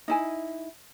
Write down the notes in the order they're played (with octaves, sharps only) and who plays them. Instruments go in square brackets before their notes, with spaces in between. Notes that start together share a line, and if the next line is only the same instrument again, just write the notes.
[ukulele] D#4 E4 G#5